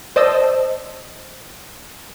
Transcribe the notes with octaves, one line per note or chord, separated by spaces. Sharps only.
C5 D5 D#5 A5 D#6 E6